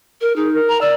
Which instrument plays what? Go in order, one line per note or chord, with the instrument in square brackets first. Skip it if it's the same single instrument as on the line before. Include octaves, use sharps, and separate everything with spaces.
[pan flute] A#4
[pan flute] D#4 [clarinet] G#4
[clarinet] A#4
[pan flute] A#5
[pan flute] D5 [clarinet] E6